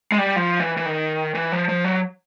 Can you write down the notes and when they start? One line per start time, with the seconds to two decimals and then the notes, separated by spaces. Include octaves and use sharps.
0.12 G#3
0.18 G3
0.36 F3
0.60 E3
0.77 E3
0.86 D#3
1.35 E3
1.52 F3
1.69 F3
1.84 F#3